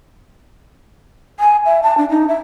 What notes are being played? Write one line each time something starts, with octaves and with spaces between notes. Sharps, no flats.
G#5
E5
A5
D4
D#4
E5